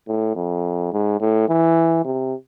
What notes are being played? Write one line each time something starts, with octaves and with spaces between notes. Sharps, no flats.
A2
F2
G#2
A2
E3
C3